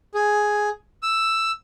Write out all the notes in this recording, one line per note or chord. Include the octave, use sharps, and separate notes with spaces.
G#4
E6